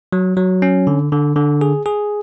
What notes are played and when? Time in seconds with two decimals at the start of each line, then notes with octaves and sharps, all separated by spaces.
0.13 F#3
0.37 F#3
0.62 C#4
0.87 D3
1.12 D3
1.36 D3
1.61 G#4
1.86 G#4